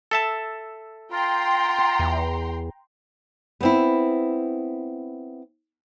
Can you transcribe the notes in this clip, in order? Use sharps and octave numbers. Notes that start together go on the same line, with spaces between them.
A4 E5 A5
F4 G5 A#5 C6
E2
B3 C4 E4